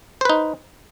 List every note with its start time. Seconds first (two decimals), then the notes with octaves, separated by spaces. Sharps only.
0.21 C5
0.25 B4
0.29 D#4